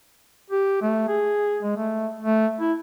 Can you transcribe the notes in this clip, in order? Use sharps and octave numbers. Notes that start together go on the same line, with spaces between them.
G4
A3
G#4
G#3
A3
A3
E4